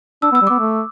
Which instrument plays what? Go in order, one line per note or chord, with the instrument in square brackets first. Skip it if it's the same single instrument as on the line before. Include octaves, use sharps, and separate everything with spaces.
[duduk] D4 [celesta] E6
[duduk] B3
[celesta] E6
[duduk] G3
[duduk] B3 [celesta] D6
[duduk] A3